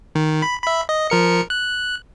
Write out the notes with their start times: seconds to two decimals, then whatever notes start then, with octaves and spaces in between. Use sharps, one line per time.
0.15 D#3
0.42 B5
0.62 E5 B5
0.89 D#5
1.10 F3 A#4 C#7
1.50 F#6